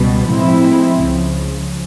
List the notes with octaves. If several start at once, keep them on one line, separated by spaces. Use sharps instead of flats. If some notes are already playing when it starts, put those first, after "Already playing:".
Already playing: C#2 B2 G3 B3
A2 F3 G#3 C4 E4
C#2 C#3 F3